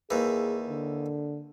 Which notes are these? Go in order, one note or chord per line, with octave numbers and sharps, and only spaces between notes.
D#2 E3 G#4
D3